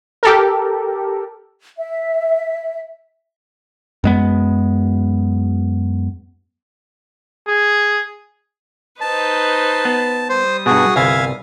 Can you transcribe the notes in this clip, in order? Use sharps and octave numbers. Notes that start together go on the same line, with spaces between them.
G4 A4 A#4
E5
F#2 G#3 B3
G#4
D#4 B4 C5 A5
B3
G3 C5 D#6
G2 B2 F#4 G#4
G1 C2 E5 F5 G#5